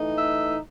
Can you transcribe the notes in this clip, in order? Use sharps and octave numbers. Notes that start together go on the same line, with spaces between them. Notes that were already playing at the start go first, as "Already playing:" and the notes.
Already playing: E3 A3 D#4
E5